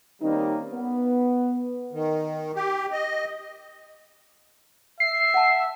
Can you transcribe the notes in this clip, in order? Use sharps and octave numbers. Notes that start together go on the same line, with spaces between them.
D#3 G3 A#3 C4 C#4 D#4
B3
D#3
G4
D#5
E5 C7
F#5 A5